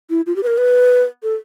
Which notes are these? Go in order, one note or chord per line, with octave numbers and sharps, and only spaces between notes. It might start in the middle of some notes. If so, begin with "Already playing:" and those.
E4
F4
G4
B4
A#4
B4
A4